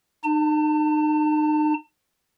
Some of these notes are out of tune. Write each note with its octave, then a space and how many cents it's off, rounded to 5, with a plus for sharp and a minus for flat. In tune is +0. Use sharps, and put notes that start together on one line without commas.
D#4 -35 A5 +35